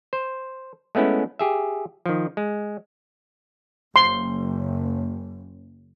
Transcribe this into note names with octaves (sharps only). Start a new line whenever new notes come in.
C5
G#3 A3 B3 C#4 E4
G4 G#4 E5
D#3 F3
G#3
F#1 C6